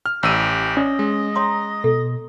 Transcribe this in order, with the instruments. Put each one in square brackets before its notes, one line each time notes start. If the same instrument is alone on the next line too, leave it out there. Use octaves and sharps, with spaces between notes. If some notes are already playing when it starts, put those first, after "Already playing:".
[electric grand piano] F6
[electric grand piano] A1 E6 D#7 [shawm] G4
[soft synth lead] C#4 [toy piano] D5 [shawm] D#5
[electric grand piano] G#3
[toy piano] C#5 C6 D#6 [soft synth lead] A#5
[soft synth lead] B2 [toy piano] A4